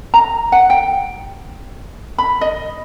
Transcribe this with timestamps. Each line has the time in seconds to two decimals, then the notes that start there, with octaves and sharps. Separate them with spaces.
0.14 A#5
0.52 F#5
0.70 G5
2.18 B5
2.41 D#5